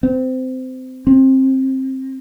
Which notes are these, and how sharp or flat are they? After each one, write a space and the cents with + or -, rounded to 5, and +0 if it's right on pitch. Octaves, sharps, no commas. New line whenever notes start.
C4 -25
C4 +20